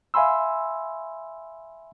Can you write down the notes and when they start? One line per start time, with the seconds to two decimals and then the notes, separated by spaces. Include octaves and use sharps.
0.14 E5 F5 G#5 B5 C6 E6